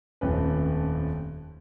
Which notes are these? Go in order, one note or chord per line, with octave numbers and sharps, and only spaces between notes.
D#1 F2 A3 C#4 B4